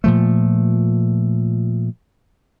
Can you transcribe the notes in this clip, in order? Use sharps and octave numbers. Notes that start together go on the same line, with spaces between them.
A#2 F3 A3